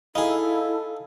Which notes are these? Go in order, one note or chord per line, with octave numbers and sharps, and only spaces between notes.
D#4 E4 G#4 A4 D#5 F5 B5